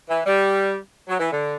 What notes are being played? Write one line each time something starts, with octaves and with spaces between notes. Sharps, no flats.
E3
G3
F#3
E3
D3